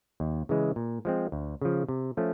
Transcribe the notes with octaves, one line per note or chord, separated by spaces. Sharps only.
D#2
C#3 E3 G#3
A#2
F3 G#3 C4
D2
C#3 F3
C3
F3 A3 C#4